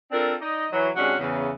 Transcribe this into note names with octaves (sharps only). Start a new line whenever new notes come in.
C4 D4 F4 A4 A#4
D#4 D5 D#5
E3 F#3
C3 G#3 C#4 D4 F#4
E2 C#3